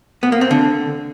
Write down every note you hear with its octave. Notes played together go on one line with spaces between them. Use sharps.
B3
A#3
C4
D3